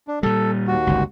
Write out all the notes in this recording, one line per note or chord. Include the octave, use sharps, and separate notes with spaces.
D4
A#2 G3 A4
D#2 F#4
G1 C#2